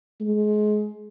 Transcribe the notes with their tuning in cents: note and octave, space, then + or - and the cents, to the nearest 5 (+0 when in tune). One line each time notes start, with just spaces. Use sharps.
G#3 +25